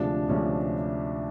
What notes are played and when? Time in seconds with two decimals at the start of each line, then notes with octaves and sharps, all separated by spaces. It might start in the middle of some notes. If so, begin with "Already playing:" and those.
Already playing: D2 C3 F3 G#3 D4
0.28 D2 C3 F3 G#3 C#4